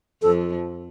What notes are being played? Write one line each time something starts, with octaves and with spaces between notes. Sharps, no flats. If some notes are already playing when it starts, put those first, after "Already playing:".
F2 F3 A4